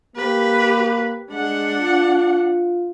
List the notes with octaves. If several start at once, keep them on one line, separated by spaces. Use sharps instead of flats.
A#3 G4 B4
G#3 D4 F#5
F4